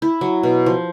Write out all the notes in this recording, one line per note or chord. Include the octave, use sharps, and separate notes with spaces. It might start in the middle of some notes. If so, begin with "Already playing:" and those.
E4
F#3
B2
F3